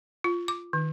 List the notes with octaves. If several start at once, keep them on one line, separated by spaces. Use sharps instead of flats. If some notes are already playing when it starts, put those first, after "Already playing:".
F4
D6
D#3